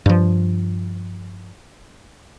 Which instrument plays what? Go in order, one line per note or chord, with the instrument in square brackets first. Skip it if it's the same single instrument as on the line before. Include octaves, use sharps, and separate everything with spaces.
[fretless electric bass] G2 F3